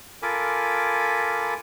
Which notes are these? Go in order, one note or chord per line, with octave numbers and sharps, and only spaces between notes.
F4 A4 A#4 G#5 B5 D6